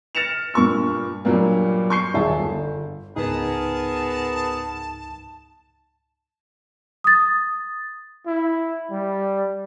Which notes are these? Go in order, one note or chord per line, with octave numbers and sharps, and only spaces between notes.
F6 A6 A#6 C#7 E7 F7
G2 A#2 C#6 E6
G2 A#2 F#3 G3 A#3
C#6 G6 C7
D#1 G#4 E5 A5
G1
C#2 G#2 B3 D#4 G#4 A#4 A5
D#6 A6
E4
G3